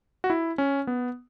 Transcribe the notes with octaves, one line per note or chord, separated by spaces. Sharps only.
F#4
E4
C#4
B3